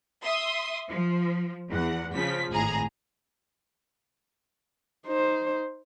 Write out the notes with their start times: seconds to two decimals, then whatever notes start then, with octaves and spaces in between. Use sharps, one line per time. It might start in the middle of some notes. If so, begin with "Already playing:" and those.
0.23 E5 C6 D#6
0.90 F3
1.70 E2 F#5
2.14 C#3 F3 B6
2.50 G#1 A2 G#4 A#5
5.07 D#4 C5